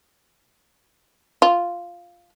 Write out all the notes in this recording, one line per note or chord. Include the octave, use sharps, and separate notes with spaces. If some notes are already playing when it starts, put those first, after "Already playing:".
F4